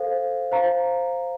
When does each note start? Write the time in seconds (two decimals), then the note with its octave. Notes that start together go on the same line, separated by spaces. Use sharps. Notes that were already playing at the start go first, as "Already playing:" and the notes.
Already playing: A4 C5 F5
0.52 C5 F5 A#5